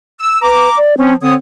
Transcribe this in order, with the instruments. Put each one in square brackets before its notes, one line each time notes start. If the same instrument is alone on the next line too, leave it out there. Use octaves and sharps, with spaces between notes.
[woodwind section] E6
[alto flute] B4 [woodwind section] A#5 D6
[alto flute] D5
[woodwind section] F3 C#4 [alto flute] C4
[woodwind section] D3 C#5 D#6 [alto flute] C4